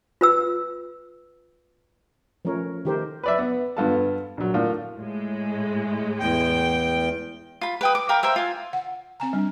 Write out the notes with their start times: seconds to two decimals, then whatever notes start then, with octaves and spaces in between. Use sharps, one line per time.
0.21 F4 B4 E6
2.45 F3 A3 C#4 A#4 C#5
2.85 D#3 A3 G4 A#4 C5
3.23 B4 D5 E5
3.39 B3
3.77 G2 B3 F4 A4 A5
4.37 A#1 F#3
4.54 A2 A#3 D4 F4
4.98 A2 G#3
6.20 E2 G5
7.61 F4 B5
7.81 B4 G5 D#6
7.95 D6
8.09 A#4 F5 G5 B5
8.23 A#4 C5 E5 G5
8.36 F4 G#5
8.73 F#5
9.20 C4 G#5 A#5
9.33 G3 D4